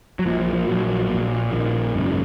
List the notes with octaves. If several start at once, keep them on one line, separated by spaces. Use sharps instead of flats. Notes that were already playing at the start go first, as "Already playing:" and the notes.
F#3
A#1 A#2 F3
F3
F3
A#1 A#2 F#3
A#1 A#2
A#1 A#2 D#3
G#1 F#2 C#3